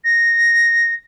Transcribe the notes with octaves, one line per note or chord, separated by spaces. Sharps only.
A#6